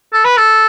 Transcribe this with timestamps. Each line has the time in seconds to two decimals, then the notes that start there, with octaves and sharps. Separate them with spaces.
0.13 A4
0.25 B4
0.37 A4